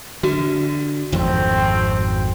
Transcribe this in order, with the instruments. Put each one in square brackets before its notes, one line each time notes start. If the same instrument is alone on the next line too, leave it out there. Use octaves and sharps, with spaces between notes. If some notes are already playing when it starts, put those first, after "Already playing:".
[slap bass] D3 [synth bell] F#4
[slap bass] G#1 F2 G#2 [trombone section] A3 C4